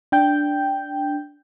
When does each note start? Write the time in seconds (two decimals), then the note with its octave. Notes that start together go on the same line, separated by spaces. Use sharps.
0.12 D4 G5 G6